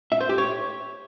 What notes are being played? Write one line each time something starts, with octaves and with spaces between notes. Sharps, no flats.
E5
C5
G4
C#5